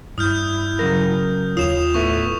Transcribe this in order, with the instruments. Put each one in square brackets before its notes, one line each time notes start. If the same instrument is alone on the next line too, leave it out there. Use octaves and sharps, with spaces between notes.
[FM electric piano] G2 [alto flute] E4 [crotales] D#6 F6 G6
[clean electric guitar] C#3 F#3 A#4
[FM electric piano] D#2 F4 [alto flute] C#5 [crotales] D#6 E7 F7
[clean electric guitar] A2 B3 E4 [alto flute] A4 [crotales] C#6